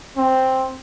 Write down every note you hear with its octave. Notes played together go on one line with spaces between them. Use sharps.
C4